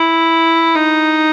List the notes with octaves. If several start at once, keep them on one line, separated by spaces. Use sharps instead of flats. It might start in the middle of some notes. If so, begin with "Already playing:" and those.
Already playing: E4
D#4